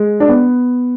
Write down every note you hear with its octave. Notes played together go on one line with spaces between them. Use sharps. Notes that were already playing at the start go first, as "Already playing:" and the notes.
Already playing: G#3
D4
B3